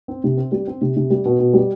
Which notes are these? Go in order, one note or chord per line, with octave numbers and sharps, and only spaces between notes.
C4
C3
C4
G3
C4
C3
C3
G3
B2
B2
G3